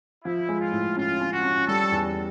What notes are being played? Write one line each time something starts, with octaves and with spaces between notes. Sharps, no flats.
F3 E4
G#3
F4
A2
C#4 F4
C#4
F#4
C#4
G3 A4
E2